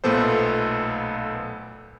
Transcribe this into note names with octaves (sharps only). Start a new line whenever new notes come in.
B1 A#2 A3 B3 A4 C5